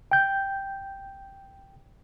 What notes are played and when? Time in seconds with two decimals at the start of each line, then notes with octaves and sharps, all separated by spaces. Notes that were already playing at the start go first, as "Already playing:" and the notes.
0.11 G5 G6